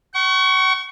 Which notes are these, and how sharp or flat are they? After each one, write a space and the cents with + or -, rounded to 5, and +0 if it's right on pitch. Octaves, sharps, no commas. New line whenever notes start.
F#5 +45 C#6 +0